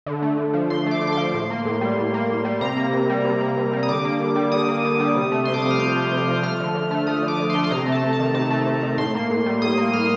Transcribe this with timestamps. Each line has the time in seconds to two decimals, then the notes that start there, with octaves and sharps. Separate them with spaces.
0.06 D3
0.22 A3
0.38 D3
0.53 F3
0.70 D3 C6
0.86 A3 D6
1.02 D3
1.07 D6
1.13 F3 C6
1.34 A2
1.50 A#3
1.65 A2
1.81 G3
1.97 A2
2.14 A#3
2.29 A2
2.45 G3
2.61 C3 A#5
2.77 A#3
2.93 C3
3.09 G3
3.25 C3
3.41 A#3
3.57 C3
3.73 G3
3.83 D#6
3.88 D3 D6
4.05 A#3
4.20 D3
4.36 G3
4.52 D3 D#6
4.68 A#3
4.84 D3
5.00 G3
5.15 C3
5.32 A3
5.45 C3 C6
5.54 D6
5.62 F3 D#6
5.71 F6
5.79 C3 G6
5.95 A3
6.11 C3
6.28 F3
6.43 A3 F6
6.60 D3
6.75 D3
6.91 A3
7.07 A3 D#6
7.22 D3
7.28 D6
7.39 D3
7.50 C6
7.55 A3
7.64 C6
7.70 C3 A#5
7.86 A3
7.92 A5
8.03 C3
8.13 A5
8.19 D#3
8.34 C3 A5
8.50 A3
8.66 C3
8.83 D#3
8.98 A2 C6
9.15 A#3
9.30 A2
9.46 G3
9.62 A2 D#6
9.78 A#3
9.93 A2 F6